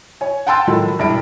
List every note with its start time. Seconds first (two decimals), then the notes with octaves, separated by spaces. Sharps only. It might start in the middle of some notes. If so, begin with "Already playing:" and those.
0.21 C#5 G#5
0.47 F#5 G5 A5 C6 E6 A6
0.67 A2 D#3 F3 F#3 G#3 A3
0.99 E1 G2 E4 E5 D7